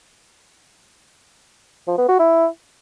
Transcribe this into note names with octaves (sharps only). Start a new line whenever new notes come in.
F3
B3
F#4
E4